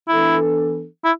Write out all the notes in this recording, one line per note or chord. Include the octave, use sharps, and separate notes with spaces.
E3 B3 D4 E4 A4
E4